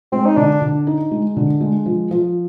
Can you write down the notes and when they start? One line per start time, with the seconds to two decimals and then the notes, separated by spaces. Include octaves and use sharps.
0.12 G#3 C4
0.26 D#4
0.37 D3 D4
0.61 D3
0.87 D#4
1.11 G#3
1.37 D3
1.61 G#3
1.86 F3
2.11 F3